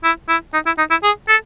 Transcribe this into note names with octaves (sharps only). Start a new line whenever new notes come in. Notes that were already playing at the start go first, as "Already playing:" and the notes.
E4
E4
D#4
E4
D#4
E4
G#4
A4